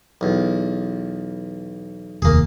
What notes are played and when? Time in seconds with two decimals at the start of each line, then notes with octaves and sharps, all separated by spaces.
0.21 B1 E2
2.22 F1 D#2 A#3 G#4